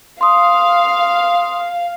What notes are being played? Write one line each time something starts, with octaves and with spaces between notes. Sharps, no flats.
F5 C6 D#6